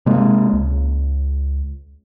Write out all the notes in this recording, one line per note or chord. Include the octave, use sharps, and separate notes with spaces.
C3 G#3 A#3
C#2